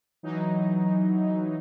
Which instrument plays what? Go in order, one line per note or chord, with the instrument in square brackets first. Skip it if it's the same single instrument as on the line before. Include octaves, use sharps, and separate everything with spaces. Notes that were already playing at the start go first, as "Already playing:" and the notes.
[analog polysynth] E3 F#3 D#4